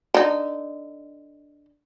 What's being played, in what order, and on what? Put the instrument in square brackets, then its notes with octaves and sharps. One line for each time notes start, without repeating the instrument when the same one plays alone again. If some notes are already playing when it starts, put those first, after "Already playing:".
[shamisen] D3 D#4